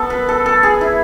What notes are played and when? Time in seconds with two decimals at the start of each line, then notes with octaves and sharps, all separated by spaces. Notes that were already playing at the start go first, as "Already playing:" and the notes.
Already playing: B3 A4
0.10 B4
0.28 A4
0.46 A4
0.63 G#4
0.81 E4